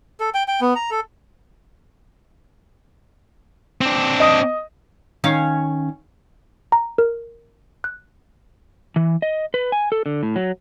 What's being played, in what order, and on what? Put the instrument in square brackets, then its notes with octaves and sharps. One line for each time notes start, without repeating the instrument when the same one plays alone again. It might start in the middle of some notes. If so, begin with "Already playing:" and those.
[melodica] A4
G5
G5
B3
A#5
A4
[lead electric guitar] C4 D4
[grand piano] D#5 D#6
[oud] D#3 C#4 F5
[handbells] A#5
A#4
F#6
[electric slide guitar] E3
D#5
B4
G#5
A4
D3
A2
F#3